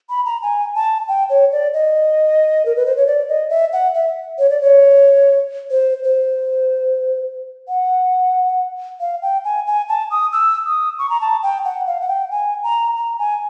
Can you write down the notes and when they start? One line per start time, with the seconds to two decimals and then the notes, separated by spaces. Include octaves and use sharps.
0.09 B5
0.25 A#5
0.42 G#5
0.75 A5
1.08 G5
1.30 C#5
1.52 D5
1.74 D#5
2.66 A#4
2.76 B4
2.86 C5
2.96 C#5
3.07 D5
3.29 D#5
3.50 E5
3.73 F#5
3.94 E5
4.38 C#5
4.50 D5
4.61 C#5
5.71 C5
6.04 C5
7.68 F#5
9.00 F5
9.22 G5
9.45 G#5
9.67 G#5
9.89 A5
10.11 D#6
10.32 E6
10.66 D#6
10.99 C#6
11.10 A#5
11.21 A5
11.43 G5
11.65 F#5
11.87 F5
12.00 F#5
12.09 G5
12.31 G#5
12.64 A#5
12.97 A#5
13.19 G#5